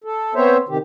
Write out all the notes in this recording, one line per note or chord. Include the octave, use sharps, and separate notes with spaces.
A4
B3 C4 C5 C#5 E5
C3 D#3 G4